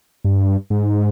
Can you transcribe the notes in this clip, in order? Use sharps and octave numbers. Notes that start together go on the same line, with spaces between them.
G2
G#2